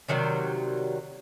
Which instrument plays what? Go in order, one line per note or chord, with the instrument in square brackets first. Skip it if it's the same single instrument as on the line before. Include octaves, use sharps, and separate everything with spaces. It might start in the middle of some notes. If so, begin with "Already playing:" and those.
[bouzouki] C3 D#3 F#3 G3